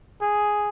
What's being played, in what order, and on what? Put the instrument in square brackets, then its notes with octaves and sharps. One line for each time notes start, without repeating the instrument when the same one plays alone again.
[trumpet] G#4